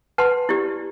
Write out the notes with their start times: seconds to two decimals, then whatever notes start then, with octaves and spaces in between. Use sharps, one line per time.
0.18 B4 F#5 A5 C6
0.49 E4 G4 D5